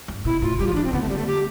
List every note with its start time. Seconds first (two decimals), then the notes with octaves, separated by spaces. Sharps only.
0.08 G2
0.25 B2 E4
0.42 A2 F4
0.59 G3 G4
0.67 F3 F4
0.75 E3 D4
0.84 C4
0.93 D3 B3
1.01 A3
1.09 G3
1.18 A3
1.27 G4